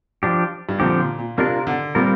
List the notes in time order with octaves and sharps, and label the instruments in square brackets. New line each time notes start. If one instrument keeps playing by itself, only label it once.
[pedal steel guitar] F3 D4 G4
[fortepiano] G2
[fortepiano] A#2 [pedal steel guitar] D3 F3 C4 G4
[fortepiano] A#2
A#2
[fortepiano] C3 [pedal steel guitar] A#3 D4 F4 A#4
[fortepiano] D3
[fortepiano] A#2 [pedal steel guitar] G3 C4 F4 A#4